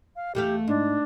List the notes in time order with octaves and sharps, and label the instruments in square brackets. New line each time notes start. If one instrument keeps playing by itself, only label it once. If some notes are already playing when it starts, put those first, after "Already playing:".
[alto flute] F5
[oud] E2 A3 F5 [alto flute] G4
[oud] G#2 [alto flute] D4